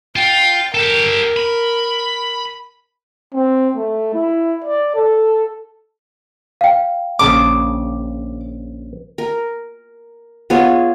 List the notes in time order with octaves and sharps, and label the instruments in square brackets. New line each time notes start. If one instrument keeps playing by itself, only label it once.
[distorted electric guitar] F4 [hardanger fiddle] G5
[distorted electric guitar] G4 A4 [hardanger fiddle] A#4
[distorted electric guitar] B5
[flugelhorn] C4
A3
E4
D5
A4
[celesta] F5 G5
[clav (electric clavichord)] A#1 C#3 A5 [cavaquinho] D6
[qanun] A#4
B3 F4 G#4 C#5